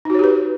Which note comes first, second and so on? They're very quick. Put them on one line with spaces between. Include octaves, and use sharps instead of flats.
D#4 F#4 C#5 G4 B4